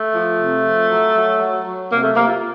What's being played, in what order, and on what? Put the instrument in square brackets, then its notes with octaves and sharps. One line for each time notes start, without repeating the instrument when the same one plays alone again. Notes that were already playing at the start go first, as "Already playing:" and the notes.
Already playing: [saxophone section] A3
F3
C3
F3
F#3
F#3
F#3
F#3
C3 A#3
A3
C3 A#3
F4